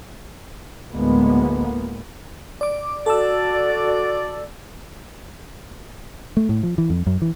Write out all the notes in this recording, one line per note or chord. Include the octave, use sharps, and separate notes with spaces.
D2 A2 G#3 A#3 B3
D5 D6
F#4 A4 D5 A5 E6
A3
A2
F3
E3
F2
F#2
E3